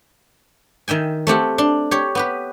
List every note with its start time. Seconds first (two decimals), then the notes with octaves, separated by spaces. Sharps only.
0.88 D#3 E5 G5 G#5
1.27 A3 C4 G4 F#5
1.58 D4 C6
1.91 G4 C#5
2.15 B3 G4 B4